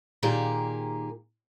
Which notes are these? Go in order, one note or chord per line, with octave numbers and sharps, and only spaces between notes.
A#2 D#3 A#3 G4 G#4